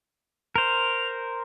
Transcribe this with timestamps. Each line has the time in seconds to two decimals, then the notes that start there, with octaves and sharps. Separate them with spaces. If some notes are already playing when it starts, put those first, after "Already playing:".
0.56 A#4 C5 F7